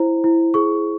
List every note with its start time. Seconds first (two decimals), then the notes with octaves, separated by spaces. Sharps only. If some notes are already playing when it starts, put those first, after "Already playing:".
Already playing: E4 C5
0.24 E4
0.54 G#4 C#6